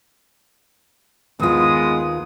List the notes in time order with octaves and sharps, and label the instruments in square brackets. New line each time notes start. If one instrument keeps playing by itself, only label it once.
[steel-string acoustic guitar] D#2 F4 [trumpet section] G#3 B3 D#6